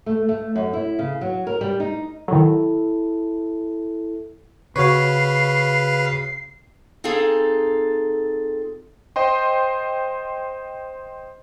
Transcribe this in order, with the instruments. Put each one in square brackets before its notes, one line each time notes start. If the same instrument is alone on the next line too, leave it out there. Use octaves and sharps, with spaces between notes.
[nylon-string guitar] A3
A3
F#2
E4
C#3
F#3
A#4
G3
D#4
[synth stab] D#3 F#3 [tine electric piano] E4 A4
[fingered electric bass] C#3 [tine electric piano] F#4 C#5 C#6 [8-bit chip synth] B4 F5 [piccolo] C7
[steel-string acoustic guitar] C4 D#4 F4 G#4 A4
[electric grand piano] C5 D#5 G5 C6